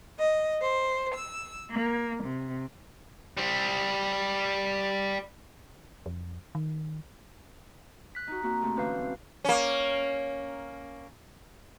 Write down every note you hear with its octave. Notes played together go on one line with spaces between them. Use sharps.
D#5
C5
E6
A#3
C3
G3 C5
F2
D#3
F#6 B6
D#4 F#4
A#3 C4 F#4
C3 A3 C4
G#2 D3 E3 C#4 B4 F5
C4
A#3 C#4